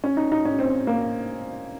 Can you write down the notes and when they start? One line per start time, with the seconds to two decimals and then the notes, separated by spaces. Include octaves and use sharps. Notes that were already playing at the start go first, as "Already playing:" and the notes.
0.04 C#4
0.17 D#4
0.32 D#4
0.45 C#4
0.59 C4
0.87 A#3